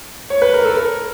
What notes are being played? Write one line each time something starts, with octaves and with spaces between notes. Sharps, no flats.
C#5
B4
A#4
A4
A#4